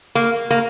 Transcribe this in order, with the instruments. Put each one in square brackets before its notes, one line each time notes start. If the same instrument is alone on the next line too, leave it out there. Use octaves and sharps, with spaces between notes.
[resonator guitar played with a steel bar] A#3
A#3